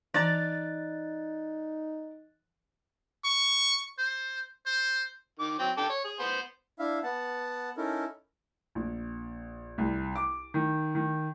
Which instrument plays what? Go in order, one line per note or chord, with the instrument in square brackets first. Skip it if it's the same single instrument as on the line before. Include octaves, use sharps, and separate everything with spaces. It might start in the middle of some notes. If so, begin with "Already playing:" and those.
[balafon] E3 [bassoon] D#4 [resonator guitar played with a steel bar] D5 A#5 [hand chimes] F#6 A6
[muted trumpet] C#6
C5
C5
[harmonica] D#3 D6
F#3 C4
A4 G5 D6
C#5
G#4
B3 C5
[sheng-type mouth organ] D4 E4 E5 F5
B3 F#5 A5
C#4 D#4 E4 A4 A#4
[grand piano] A#1
C2
D6
D#3
D#3